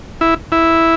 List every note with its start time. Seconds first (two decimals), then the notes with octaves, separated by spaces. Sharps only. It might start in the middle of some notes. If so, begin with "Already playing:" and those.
0.21 E4
0.52 E4